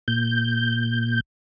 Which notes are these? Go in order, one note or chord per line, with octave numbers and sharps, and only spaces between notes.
A#2 G6